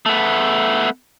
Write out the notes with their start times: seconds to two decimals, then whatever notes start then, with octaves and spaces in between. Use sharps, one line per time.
0.06 A3 B3